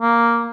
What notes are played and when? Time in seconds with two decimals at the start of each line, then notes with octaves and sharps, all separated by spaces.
0.01 A#3